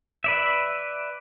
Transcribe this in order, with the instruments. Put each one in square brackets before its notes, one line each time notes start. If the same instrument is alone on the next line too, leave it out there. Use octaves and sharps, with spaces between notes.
[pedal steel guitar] B4 D5 E5